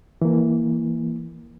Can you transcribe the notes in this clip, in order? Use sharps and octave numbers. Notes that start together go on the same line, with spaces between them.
E3 A#3